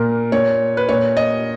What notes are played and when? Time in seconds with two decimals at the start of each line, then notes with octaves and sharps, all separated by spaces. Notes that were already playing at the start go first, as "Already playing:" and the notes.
Already playing: A#2 A#4
0.32 A#2 C#5
0.77 B4
0.89 A#2 C#5
1.17 D#5